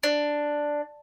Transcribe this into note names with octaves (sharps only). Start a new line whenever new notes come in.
D4